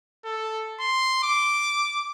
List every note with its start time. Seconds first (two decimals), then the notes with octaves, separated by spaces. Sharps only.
0.25 A4
0.80 C6
1.23 D6